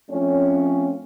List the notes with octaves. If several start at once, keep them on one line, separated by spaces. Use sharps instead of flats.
F3 A3 C4 C#4